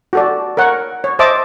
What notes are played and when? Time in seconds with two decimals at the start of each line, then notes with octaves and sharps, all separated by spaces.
0.13 F#4 A4 D5
0.57 A#4 C#5 F#5 C#6
1.04 C#5
1.19 C5 D#5 E5 A5 D6